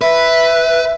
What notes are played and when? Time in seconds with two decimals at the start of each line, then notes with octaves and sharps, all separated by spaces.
0.01 B4 E5